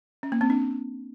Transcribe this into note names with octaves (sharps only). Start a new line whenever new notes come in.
C#4
A#3
C4
D4